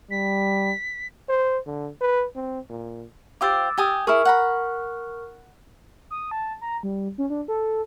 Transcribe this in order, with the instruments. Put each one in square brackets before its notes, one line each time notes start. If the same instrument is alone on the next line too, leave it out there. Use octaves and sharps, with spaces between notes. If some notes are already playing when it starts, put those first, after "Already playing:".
[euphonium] G3 [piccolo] B6
[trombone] C5
D3
B4
C4
A#2
[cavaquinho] F4 G4 C5 [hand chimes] D6 E6 A6
[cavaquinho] G4 G#5 D#6
[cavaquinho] E4 G#4 [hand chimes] A#4 C#6 F6
[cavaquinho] F#5 A#5 B5
[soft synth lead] D#6
A5
A#5
G3
C#4
D4
A4